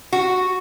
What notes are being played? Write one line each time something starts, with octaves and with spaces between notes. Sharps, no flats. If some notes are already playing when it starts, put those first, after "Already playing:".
F#4